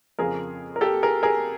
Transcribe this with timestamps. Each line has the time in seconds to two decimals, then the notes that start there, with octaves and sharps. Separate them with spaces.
0.19 F2 C#3 F3 G#4 A#4
0.76 A#4
0.81 G4 A4
1.03 G#4 A#4
1.23 G#4 A#4